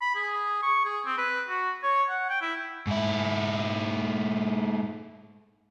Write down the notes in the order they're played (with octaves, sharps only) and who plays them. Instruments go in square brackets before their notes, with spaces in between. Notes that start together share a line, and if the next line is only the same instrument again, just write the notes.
[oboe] B5
G#4
C#6
G#4
C4
B4
F#4
C#5
F#5
G5
E4
[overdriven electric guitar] G#2 E4